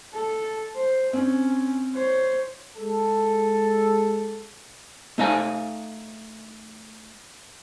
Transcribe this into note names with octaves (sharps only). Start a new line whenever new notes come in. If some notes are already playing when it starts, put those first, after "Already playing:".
A4
C5
C4 C#4
C5 C#5
G#3 A4
A3 D#4 F5 G#5